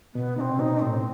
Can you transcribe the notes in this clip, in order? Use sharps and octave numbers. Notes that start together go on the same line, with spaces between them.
B2 B3
C3 C4 D#4
B2 D#4
A2 C4